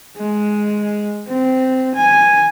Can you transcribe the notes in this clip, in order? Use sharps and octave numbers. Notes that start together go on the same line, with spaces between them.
G#3
C4
G#5